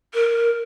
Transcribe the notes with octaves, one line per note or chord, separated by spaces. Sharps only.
A#4